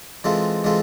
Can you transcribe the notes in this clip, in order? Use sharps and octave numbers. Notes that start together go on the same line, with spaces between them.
E3 G#3 C4 F4 A4
E3 G#3 C4 F4 A4